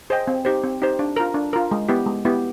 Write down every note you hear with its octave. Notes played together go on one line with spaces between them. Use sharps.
G#4 C5 D#5 G5
C4
D#4 G4 C5
C4
D#4 G4 C5
D4
F4 A#4
D4
F4 A#4
G#3
B3 E4 G4
G#3
B3 E4 G4